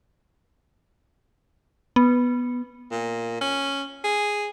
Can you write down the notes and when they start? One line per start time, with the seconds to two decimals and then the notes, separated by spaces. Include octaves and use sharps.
1.96 B3
2.91 A#2
3.41 C#4
4.04 G#4